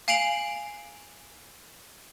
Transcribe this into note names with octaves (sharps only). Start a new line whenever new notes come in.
F5 G#5 C7 D7 F7 F#7